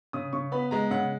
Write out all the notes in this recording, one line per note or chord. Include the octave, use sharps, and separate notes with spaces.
C#3 D#6
C#3 C#6
B3 B5
G#3 A#5
C#3 F#5